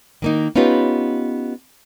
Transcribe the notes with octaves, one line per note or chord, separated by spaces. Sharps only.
D#3 A#3 D#4
B3 C#4 D#4 F4 G4 B4